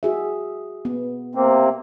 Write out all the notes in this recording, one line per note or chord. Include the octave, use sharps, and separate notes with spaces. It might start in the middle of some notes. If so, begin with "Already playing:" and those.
F#4 G#4 E5
B3
C3 A#3 C4